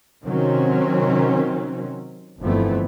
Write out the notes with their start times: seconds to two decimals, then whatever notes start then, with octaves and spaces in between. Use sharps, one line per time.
0.26 C3 D#3 F#3 C4 C#4
2.40 G1 F2 D3 E3 A3 B3